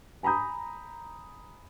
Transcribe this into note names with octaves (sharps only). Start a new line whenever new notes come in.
G#5 A#5 B5 D#6 G6